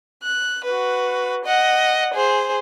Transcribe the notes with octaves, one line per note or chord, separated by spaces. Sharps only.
F#6
F#4 B4
D#5 F#5
G#4 C5